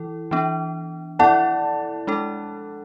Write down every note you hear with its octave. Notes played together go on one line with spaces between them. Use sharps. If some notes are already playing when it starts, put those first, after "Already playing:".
Already playing: E3 E4 A4
E3 B3 D4
B3 E4 A4 D5 F#5 A5
G#3 D4 A4